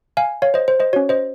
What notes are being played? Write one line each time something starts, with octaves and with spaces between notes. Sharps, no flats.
F5 G#5
C#5 F5
C5 D#5
C5
C5 D#5
C#4 F#4 C#5
C5 D#5